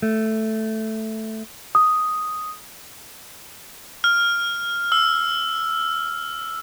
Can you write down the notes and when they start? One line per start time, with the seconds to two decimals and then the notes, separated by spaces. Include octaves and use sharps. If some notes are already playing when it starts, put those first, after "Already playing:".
0.02 A3
1.75 D#6
4.04 F6
4.92 E6